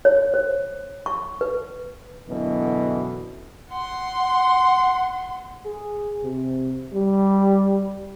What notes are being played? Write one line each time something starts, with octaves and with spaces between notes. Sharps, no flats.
C#5
C5
C#6
B4
F#2 B2 D3 E3
F#5 C6
G#4
C3
G3